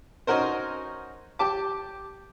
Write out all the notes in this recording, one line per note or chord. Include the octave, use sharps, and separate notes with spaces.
C#4 D#4 F#4 A#4 C5
G4 A5 D6